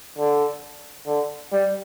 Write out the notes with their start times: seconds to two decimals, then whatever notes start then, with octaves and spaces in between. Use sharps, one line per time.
0.18 D3
1.07 D3
1.52 G3